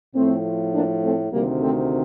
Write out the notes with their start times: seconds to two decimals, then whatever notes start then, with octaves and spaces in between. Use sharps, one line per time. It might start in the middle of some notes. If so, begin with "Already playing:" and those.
0.14 A2 F3 A3 C4
0.73 A#3 D4
1.03 A3 C4
1.32 D2 C3 D#3 G3 A#3
1.62 A3 C4